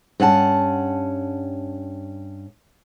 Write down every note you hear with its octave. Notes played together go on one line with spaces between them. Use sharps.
G2 C#4 F#5 A5